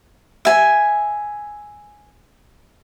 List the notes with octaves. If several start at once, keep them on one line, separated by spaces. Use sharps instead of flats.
E5 G#5